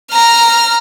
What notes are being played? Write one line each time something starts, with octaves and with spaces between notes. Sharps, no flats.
A#5 F6